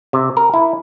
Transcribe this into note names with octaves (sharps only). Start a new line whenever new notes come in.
C3
A#4
E4